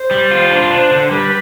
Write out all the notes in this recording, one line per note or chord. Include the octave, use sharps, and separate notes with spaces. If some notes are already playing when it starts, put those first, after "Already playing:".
Already playing: C5
G3
F4
D4
D4 C5
D3
G3 B4